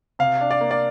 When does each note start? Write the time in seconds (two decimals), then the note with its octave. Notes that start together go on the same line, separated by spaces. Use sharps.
0.19 C3 F5
0.41 D4
0.51 D5
0.61 A#3
0.71 D5